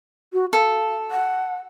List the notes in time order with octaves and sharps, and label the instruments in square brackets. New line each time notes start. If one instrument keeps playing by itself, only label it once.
[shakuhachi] F#4
[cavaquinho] A4 [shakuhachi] F5
[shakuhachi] F#5